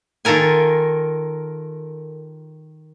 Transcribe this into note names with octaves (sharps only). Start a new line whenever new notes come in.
D#3 F4 A4 A#4 G#5